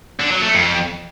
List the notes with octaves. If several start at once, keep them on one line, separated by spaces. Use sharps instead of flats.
D3
F#3
A3
F2